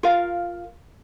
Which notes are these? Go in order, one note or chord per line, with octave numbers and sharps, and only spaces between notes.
F4 A#4 F5